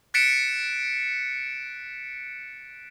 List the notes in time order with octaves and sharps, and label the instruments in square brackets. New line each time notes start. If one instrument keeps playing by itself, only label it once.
[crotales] F#6 A6 B6 C#7 D7 E7